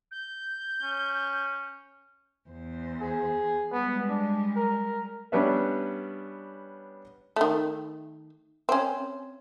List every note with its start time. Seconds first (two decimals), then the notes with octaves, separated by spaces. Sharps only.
0.11 G6
0.82 C#4
2.50 E2 C5
3.00 G#4
3.72 G3 G#3 B3
4.09 D4
4.56 A#4
5.32 G3 B3 C#4 D4 B4 E5
7.36 D#3 A3
8.69 C4 C#4